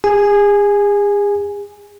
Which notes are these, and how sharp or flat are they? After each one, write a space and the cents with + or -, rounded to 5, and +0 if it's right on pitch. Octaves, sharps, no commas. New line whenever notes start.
G#4 -40 G#5 +0